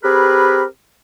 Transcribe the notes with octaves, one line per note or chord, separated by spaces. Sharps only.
C4 G4 G#4 A#4 B4 B5